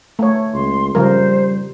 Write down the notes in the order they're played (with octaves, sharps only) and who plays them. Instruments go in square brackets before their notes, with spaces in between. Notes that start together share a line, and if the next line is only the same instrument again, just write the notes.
[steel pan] A3 C#5
[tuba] C#2 [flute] C6
[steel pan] C#3 F3 A#4 [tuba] G3 [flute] C5